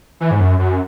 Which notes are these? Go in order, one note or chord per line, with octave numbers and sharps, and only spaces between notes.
E3
G#2
F#2
F#2